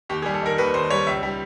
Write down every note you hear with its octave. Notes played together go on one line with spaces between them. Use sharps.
D#2 G4
G3 G#4
A4
D#3 A#4
D#2 B4
D#2 C5
G3 C#5
C#2 E5
G3